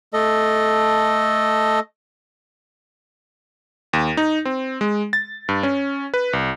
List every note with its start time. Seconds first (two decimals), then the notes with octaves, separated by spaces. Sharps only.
0.14 A3 A4 D#5
3.93 D#2
4.17 D#4
4.45 C4
4.81 G#3
5.13 A6
5.49 G2
5.63 C#4
6.14 B4
6.33 C2